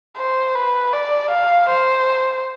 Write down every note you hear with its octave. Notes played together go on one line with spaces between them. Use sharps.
C5
B4
D5
F5
C5